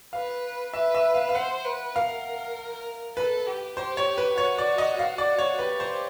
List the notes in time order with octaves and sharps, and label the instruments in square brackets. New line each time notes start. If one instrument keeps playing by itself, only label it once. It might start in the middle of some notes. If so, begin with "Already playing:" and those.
[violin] B4 [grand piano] F5
[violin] B4 [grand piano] E5
[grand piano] E5
F5
F5
[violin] C5 [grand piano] F#5
[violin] B4
[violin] A#4 [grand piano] F5
[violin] A4 [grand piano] B4
[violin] G4
[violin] G4 [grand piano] C5
[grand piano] C#5
B4
[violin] F#4 [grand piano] C#5
[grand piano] D5
D#5
F5
D5
C#5
[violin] G4 [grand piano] B4
[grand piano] C5